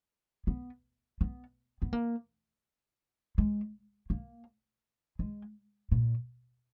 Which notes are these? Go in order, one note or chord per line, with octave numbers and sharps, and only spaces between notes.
B3
B3
B3
A#3
G#3
A#3
G#3
A#2